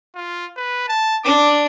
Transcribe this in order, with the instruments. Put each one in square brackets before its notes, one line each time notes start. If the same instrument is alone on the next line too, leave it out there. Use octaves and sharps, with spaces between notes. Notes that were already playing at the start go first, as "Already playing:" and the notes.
[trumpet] F4
B4
A5
[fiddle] D4 [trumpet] D6